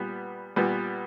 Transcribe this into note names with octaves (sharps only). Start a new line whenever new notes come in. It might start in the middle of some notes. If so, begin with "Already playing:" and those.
Already playing: A#2 G3 B3
A#2 G3 B3